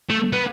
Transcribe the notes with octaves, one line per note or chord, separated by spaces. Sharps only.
A3
B3